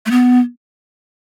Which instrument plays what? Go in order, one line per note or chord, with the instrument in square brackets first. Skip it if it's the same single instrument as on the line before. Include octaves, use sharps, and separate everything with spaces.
[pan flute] A3
B3